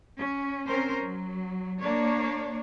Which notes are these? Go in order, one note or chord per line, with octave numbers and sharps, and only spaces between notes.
C#4
C4 C#4 A#4 C5
F#3
A#3 D4 C#5